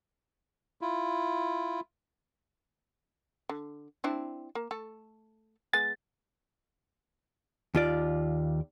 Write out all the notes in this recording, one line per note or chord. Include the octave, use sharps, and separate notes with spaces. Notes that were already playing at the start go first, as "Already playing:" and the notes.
E4 F4
D3
C4 D4 E4
A#3
A3 A4
G#3 B3 G#5 A6
D#2 F4 D5